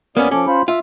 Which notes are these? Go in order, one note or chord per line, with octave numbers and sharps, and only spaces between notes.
E2 A#3 B3 C#4 D5 D#6
F3 C#4 A4 D6
F4 C5 B5
F4 E5